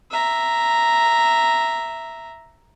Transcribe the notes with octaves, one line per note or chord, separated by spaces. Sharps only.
E5 A#5